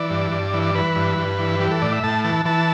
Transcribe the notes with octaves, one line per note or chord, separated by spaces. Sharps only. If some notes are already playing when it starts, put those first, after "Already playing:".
Already playing: E3 D5
G2
G2
E3
D5
E3 B4
G2
G2
E3
E3 G4
A4
A2 D5
E5
A2 A5
E3 A5
E3 A5